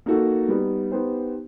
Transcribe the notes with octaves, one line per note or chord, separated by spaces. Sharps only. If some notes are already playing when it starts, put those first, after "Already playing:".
A#3 D#4 F#4 A4
G3 B3 D#4
B3 D#4 G4 C5